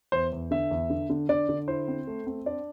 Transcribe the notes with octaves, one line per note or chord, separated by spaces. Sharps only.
E2 C5
E2
D3 E5
E2
D3
D3
D3 D5
D3
E4 C5
C4
A3
C4
D4 D5